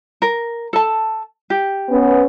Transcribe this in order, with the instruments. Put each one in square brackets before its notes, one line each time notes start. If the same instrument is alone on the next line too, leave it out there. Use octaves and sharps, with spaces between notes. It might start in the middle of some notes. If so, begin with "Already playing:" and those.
[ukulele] A#4
A4 A5
G4
[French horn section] B3 C#4